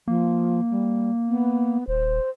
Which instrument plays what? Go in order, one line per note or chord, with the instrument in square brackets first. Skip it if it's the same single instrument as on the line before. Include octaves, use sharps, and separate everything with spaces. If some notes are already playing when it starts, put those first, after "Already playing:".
[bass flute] F3 [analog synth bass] A#3
[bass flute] G3
B3
[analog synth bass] D#1 [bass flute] C5